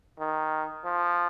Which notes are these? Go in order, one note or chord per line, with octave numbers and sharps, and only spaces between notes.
D#3
F3